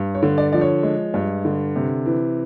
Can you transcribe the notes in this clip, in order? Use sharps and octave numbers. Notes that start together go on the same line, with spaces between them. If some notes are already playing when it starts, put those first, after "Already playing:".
Already playing: G2
C#5
D3
D5
F3 D5
C#5
G#3
G2
D3
C3
E3